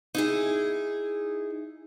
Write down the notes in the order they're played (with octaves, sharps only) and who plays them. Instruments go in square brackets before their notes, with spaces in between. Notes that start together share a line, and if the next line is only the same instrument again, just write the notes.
[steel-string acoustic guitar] D#4 E4 G#4